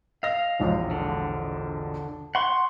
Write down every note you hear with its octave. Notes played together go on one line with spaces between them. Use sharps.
D#5 F5 E6 A#6
E1 A#1 G#2
D3
F#5 C6 C#6